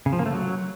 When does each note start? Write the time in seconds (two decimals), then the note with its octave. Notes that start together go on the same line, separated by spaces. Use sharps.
0.06 C#3
0.13 F3
0.19 A#3
0.26 A3
0.32 F#3